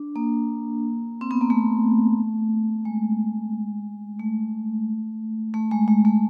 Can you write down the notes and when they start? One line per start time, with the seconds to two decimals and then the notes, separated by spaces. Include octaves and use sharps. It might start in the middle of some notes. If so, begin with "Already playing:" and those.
Already playing: D4
0.16 A#3
1.21 C4
1.31 B3
1.41 A#3
1.50 A3
2.85 G#3
4.20 A3
5.54 A3
5.71 G#3
5.88 G#3
6.05 A3